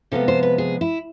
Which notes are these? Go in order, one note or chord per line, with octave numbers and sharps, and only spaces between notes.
C3 F3 G#3 B3 A4
C5
B4
G#4
E4